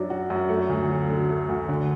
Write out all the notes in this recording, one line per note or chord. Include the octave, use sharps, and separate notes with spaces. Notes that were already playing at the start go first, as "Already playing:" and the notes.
Already playing: F#2 F#3 D4
F#4
F#2
A3
D2
F#3
D3
A3
D2
D3